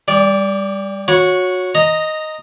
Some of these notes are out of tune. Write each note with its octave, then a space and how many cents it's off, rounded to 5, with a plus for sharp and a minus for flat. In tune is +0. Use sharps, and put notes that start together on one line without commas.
G3 +25 D5 -15
F#4 -20 C#5 +0 B5 -30
D#5 +0 A#5 -10